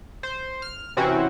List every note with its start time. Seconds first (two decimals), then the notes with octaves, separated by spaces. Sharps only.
0.23 C5
0.62 F6
0.97 C3 E3 C4 C#4 F#4